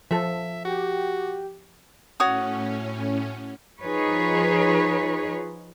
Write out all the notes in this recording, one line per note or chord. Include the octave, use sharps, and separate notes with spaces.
F3 A4 E5
F#4 G4
A2 C#4 F#4 C#5 D#6
F3 D#4 F4 G#4 B4 C#5